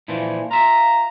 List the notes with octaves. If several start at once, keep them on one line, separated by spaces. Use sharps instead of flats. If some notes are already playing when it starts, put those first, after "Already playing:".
A#2 E3 F3
F4 E5 A#5